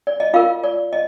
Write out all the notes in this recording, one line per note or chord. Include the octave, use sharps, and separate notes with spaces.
D5
D#5
F4 A#4 F5
D5
D#5